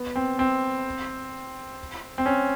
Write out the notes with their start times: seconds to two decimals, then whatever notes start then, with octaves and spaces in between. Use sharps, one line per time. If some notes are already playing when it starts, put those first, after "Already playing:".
Already playing: B3
0.16 C4
0.39 C4
2.18 C4
2.26 C#4